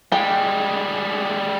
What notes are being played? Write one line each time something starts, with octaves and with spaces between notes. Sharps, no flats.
G3 G#3 G5